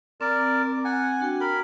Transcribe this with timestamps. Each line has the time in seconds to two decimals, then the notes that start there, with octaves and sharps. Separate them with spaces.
0.21 C4 A#4 D5
0.85 F#5 G#5
1.20 D4 F#4 G5
1.40 A#4 G5 B5